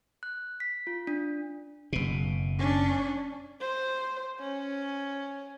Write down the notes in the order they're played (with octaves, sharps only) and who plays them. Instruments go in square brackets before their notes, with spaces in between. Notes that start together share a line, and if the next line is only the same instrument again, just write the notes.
[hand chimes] F#6
B6
F4
D4
[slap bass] F#1 B2
[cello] C#4 D4
[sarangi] C5
C#4